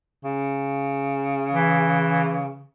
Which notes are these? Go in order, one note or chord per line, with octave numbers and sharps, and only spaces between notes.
C#3
E3